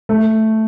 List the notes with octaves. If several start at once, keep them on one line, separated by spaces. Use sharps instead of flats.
A3